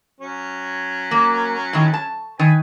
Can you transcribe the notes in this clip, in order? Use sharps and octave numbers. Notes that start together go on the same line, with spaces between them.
F#3 C#4
A#3
A2 D#3
A5
D#3 B4 G#5